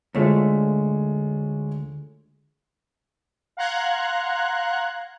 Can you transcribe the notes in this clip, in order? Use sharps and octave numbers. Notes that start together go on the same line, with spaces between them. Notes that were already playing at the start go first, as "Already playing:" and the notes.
D2 G#3 A3 F4 C#5
F5 F#5 A#5 C6 F#6 G#6